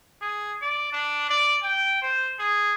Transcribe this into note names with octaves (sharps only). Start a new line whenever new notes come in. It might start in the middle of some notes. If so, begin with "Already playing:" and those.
G#4
D5
D4
D5
G5
C5
G#4